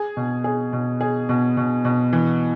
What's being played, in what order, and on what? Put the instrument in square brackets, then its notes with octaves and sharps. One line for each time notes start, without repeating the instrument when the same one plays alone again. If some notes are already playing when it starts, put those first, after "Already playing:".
Already playing: [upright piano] G#4
B2
G#4
B2
G#4
B2
B2
B2
E3